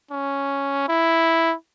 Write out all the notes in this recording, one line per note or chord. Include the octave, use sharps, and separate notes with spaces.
C#4
E4